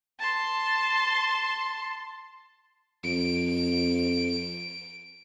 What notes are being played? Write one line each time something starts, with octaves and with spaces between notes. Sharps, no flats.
A5 C6
F2 D7